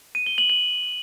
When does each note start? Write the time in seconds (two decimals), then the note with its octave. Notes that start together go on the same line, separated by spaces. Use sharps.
0.15 D#7
0.26 G7
0.38 F#7
0.50 F#7